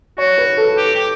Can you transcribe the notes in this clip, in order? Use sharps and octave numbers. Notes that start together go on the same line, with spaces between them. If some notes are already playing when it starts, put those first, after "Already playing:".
F#4 C#5
B4
A4
G4
G4